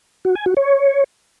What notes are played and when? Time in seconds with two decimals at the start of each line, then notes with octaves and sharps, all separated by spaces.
0.25 F#4
0.35 G#5
0.46 F#4
0.57 C#5